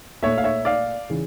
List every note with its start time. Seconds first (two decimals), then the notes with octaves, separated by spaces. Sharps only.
0.23 A#2 A3 C#5 E5
0.38 F5
0.44 C#5 E5
0.65 D5 F5
1.10 C#3 E3